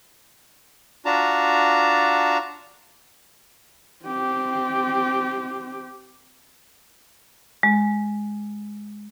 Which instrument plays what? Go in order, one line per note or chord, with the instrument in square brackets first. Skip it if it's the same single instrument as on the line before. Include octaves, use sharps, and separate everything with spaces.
[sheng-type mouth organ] D4 F4 F#4 A5 A#5
[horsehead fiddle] C4 G4
[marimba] G#3